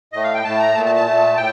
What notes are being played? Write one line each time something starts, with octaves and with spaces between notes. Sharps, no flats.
A2 A3 D#5
F5
G5
A2 A3 A5
A#5
A#2 A3 A5
A5
A5
A#2 A3
A2 G5